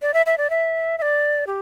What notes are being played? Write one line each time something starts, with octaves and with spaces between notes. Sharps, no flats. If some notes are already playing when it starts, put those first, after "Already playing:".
D5
E5
E5
D5
E5
E5
D5
G4